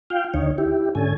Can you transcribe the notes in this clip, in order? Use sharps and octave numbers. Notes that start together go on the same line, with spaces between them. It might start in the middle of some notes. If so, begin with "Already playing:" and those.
F4 F5 G5
D#2 D3 D#4 C#5
E4 G4
G#2 D3 C#4 A4 G#5